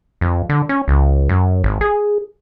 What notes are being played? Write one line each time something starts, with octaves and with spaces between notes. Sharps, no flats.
F2
D3
C#4
C#2
F#2
G#1
G#4